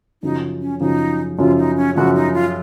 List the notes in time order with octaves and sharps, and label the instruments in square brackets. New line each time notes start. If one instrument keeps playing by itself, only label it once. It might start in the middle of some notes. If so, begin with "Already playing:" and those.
[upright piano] F#2 C#3 F3 [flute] D#4
[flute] C#4
[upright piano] F#2 C#3 F3 [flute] D#4
[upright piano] F#2 C#3 F3 [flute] F4
[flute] D#4
C#4
[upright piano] F#2 C#3 F3 [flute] F#4
[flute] D#4
F4